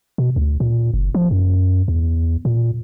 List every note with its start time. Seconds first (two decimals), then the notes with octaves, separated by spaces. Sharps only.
0.18 B2
0.36 D2
0.60 A#2
0.94 F#1
1.15 F3
1.31 F#2
1.88 E2
2.45 A#2